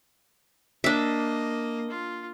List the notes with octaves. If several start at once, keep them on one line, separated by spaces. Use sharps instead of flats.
A#3 D4 D#5 E5
F4